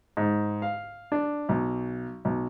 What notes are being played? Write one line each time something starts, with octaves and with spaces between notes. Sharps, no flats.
G#2
F5
D4
B1
B1